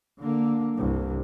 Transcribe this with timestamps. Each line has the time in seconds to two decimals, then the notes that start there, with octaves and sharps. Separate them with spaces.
0.20 D3 A#3
0.75 C2 G2